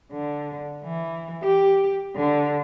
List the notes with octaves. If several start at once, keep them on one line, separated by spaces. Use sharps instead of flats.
D3
E3
G4
D3